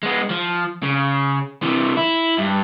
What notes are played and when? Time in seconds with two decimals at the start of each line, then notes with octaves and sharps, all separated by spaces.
0.03 G#3 B3
0.30 F3
0.83 C#3
1.63 C3 E3
1.97 E4
2.38 G2